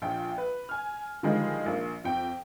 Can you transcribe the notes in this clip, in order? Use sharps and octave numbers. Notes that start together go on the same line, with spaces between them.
A#1 A#2 G5
B4
G#5 F6
D3 D#3 F3 G3 G#3
A#1 A#3
F2 G5